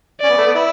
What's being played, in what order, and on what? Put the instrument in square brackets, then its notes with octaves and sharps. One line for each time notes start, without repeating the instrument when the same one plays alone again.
[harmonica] C#4 [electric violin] D5
[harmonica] B3
A3
B3
E4